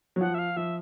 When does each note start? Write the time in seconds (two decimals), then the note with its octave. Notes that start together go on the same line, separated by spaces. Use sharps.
0.16 F#3
0.21 F3 F#5
0.34 E5
0.39 F5
0.56 F3 E5